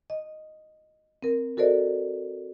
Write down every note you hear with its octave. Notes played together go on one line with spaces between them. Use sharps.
D#5
C4 A#4
F#4 A4 A#4 C5 D5 D#5